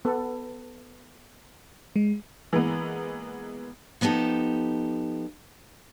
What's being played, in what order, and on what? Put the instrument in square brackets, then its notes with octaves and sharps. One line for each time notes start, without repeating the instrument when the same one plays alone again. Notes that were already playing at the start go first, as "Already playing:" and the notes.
[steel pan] B3 A4
[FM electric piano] G#3
[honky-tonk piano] E3 G#3 A#3 B3
[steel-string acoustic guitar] F3 B3 D#4 G4 A4